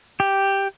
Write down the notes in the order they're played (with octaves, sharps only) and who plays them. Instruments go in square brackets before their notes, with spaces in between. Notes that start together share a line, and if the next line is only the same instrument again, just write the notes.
[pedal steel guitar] G4